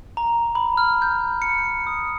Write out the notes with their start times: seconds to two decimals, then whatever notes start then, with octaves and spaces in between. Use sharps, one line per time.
0.17 A#5
0.55 B5
0.77 F6
1.02 G6
1.42 C#7
1.87 D#6